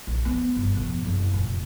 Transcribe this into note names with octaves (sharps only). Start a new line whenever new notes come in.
A#1
B3 C4
G1
F2 B2
F#1
F1 A#2